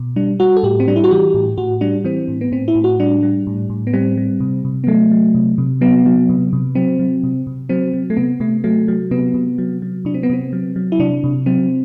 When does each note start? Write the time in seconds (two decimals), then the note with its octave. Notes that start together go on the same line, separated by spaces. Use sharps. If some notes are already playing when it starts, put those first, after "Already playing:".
Already playing: B2
0.16 G3 D4
0.40 G3 F#4
0.56 A4
0.63 A2 G4
0.80 C4
0.88 G3 D4
0.96 E4
1.04 F#4
1.11 E3 G4
1.34 A2
1.58 A2 F#4
1.81 G3 D4
2.04 E3 C4
2.28 A2
2.41 B3
2.52 A2 C4
2.68 E4
2.75 A2
2.84 F#4
2.99 G3 D4
3.23 G3
3.47 A2
3.70 A2
3.87 B3
3.93 G3 C4
4.17 G3
4.40 C3
4.65 C3
4.84 B3
4.87 F#3 A3
5.11 F#3
5.35 C3
5.58 C3
5.81 F#3 B3
6.06 F#3
6.29 C3
6.53 C3
6.75 F#3 C4
6.99 F#3
7.24 C3
7.47 C3
7.69 F#3 C4
7.94 F#3
8.10 A3
8.17 C3 B3
8.40 C3 A3
8.64 F#3 A3
8.88 F#3
9.11 C3 B3
9.34 C3
9.58 F#3
9.82 F#3
10.05 C3 D4
10.14 C4
10.23 B3
10.30 C3 C4
10.53 F#3
10.76 F#3
10.92 E4
11.00 C3 D4
11.24 C3
11.46 F#3 C4